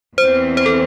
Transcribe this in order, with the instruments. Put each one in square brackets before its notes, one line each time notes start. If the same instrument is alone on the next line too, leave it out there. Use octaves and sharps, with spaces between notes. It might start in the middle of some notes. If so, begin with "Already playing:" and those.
[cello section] E2 E3 C4 [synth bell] C5
[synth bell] C5
A4